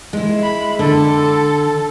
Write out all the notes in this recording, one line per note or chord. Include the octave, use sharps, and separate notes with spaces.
G#3 E4
B5
D3 A4